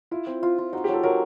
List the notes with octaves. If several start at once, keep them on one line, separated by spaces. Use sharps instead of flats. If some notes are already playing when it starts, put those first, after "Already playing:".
E4 F4
C4
F4
F4
D#4 F#4
G4
F#3 A4
F#3 A#4